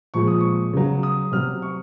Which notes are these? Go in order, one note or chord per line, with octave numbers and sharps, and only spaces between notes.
A#2 F3 G#3 C#6
D#6
C#6
C#3 F#3
D#6
C3 F#3 F6
C#6